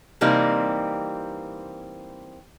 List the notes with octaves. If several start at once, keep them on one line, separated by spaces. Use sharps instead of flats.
C3 E3 G3 A#3 C4 D#4